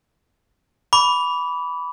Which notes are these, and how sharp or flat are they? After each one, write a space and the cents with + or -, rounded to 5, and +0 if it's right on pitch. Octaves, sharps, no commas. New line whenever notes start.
B5 +0 D6 -35